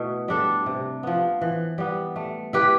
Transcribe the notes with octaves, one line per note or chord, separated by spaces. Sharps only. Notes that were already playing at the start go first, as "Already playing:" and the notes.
Already playing: B2 A3 E4 B4
G3 D4 A4
C3
F3 B3
E3
G3 B3
A3
E4 G4 B4